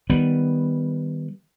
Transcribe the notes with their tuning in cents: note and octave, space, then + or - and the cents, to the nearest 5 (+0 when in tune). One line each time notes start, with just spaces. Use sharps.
D#3 +0 G3 +0 B3 +0